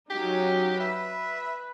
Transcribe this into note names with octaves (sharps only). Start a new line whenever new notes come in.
F#3 C#4 D#4 G4
B4 E5